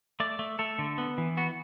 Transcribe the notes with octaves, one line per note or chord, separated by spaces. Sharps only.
A3 D5
A3
A3 A4
D3
B3
E3
B3 F#4